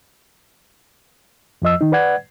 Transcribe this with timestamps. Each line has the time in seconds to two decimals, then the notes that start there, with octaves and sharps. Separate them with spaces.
1.62 F2 F3 D#5 E6
1.81 D#3 D#4
1.92 B4 D5 F#5 G#6